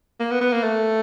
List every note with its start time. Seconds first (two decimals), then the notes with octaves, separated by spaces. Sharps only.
0.20 A#3
0.31 B3
0.41 B3
0.52 A#3
0.63 A3